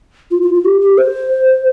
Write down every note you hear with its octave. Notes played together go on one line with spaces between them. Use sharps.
F4
F4
F4
G4
G4
C5